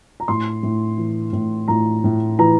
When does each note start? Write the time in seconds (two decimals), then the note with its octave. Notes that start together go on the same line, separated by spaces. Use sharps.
0.20 A#5
0.28 A2 C6
0.63 A2
0.98 E3
1.33 A2
1.68 A2 A#5
2.04 A2
2.39 E3 A#5